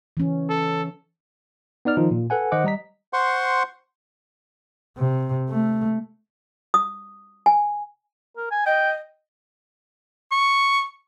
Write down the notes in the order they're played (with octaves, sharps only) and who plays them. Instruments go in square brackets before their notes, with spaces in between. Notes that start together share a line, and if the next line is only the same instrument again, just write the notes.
[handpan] E3 C#4
[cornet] A4
[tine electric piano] B3 D#4 D5 F6
D#3 F3 D#4 F4
A#2
A4 B4 F#5 G#5
D#3 C5 D#5 F#5 D6
G3 D#5 A#5 B6
[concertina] C5 F#5 C6 C#6
[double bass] C3
A3
[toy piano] D#6
G#5
[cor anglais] A#4
G#5
[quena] D#5 [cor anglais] G5
[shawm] C#6